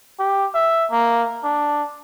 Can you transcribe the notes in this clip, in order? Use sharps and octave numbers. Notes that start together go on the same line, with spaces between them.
G4
E5
A#3
D4